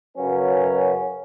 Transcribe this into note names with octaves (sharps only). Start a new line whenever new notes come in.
F#2 C#3 F#3 C#4 B4